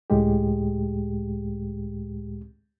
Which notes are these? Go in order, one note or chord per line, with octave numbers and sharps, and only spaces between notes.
C#2 A2 G#3 G4